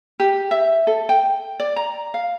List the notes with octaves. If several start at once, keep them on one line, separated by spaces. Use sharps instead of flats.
G4
E5
A4
G5
D5
A#5
F5